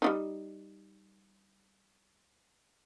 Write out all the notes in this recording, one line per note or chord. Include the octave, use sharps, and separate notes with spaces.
G3 D4 D#4